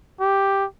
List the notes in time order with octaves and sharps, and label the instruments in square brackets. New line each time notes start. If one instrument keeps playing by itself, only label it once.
[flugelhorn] G4